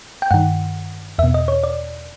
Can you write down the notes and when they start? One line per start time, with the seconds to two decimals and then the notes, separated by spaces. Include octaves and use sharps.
0.22 G5
0.31 G2 D#3 F#5
1.19 E2 B2 E5
1.34 D#5
1.48 C#5
1.64 D5